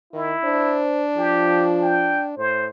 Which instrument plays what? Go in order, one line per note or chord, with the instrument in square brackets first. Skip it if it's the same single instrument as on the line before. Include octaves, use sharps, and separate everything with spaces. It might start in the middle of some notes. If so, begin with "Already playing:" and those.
[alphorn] D#3 [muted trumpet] E4
[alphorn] D4 [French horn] C5
[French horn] F3 [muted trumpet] G4
[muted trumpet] G5
[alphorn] A2 [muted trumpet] C5